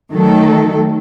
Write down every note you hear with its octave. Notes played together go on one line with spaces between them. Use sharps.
D#3 F#3 A3 A4